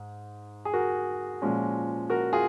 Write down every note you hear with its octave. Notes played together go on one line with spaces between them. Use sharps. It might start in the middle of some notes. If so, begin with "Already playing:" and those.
Already playing: G#2
G#4
F#4 A#4
A#2 F3 G#3 C#4
F#4 A#4
F4 G#4